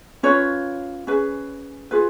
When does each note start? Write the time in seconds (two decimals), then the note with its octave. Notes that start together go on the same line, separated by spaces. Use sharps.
0.23 C#4 F4 B4 C#5
1.07 C#4 G#4 B4
1.91 F4 G#4 B4